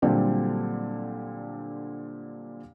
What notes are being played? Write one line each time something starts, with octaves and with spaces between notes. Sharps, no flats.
A#2 D3 F#3 G3 C4 G4